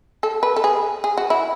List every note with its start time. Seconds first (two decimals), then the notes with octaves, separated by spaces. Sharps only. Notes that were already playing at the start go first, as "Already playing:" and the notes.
0.23 A4
0.43 B4
0.56 A4
0.64 G#4
1.04 G#4
1.17 F#4
1.30 E4